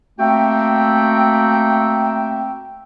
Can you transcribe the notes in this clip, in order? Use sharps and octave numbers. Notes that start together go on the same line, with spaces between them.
A3 A#3 C4 F#4 E5 G5